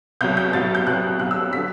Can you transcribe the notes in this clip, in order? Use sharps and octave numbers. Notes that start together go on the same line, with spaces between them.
C2 B2 F#3 G6
G6
C2 B2 F#3 A6
G6
C2 B2 F#3 F#6
C2 B2 F#3 F#6
E6
D3 F#3 B6